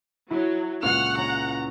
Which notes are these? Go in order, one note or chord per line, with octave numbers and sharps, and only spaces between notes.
F#3 E4
C#2 A#2 C#3 F#5 C#6 F6
C#4 A#5